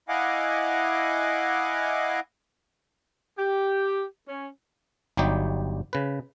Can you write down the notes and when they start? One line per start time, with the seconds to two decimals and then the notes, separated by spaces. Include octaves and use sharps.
0.09 E4 D#5 F5 F#5 G#5 D6
3.39 G4
4.29 C#4
5.17 G1 F#3 G3 D#4 G4 G5
5.93 C#3 B4